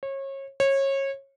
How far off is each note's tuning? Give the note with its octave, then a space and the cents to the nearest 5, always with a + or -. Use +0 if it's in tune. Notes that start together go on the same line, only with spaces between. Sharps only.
C#5 -30
C#5 -25